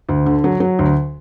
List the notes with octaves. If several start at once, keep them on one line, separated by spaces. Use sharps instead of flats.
D2
D3
F#3
F#3
D2